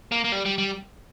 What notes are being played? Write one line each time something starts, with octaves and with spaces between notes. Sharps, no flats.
A#3
A#3
G3
G3
G3